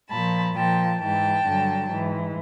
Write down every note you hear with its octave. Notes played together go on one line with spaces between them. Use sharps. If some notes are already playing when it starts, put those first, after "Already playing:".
A#2 F3 A5 B5
A#2 F3 G5 A5
G#2 E3 G5 A5
G2 D3 F#3
G#2 E3